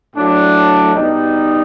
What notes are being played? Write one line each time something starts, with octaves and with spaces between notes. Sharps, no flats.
A2 F#3 D4
B2 G3 D#4